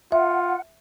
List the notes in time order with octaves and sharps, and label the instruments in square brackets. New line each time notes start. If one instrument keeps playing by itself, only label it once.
[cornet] F4 [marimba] E5 [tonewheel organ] F#5